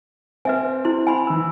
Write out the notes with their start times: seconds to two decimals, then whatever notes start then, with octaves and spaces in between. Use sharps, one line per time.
0.45 C4 B4 E5 G#5
0.85 E4 C6
1.07 G#5 B5 C6
1.27 E3 E6